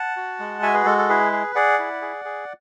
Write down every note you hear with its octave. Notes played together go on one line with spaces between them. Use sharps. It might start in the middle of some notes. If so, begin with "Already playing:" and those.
Already playing: F#5 A5
F#4
G#3
F#4 E5 G#5
G#4 B4
G#3 A4
A4
E4 G#4 B4
G#4
G#4 D5 F#5
E4
G#4
G#4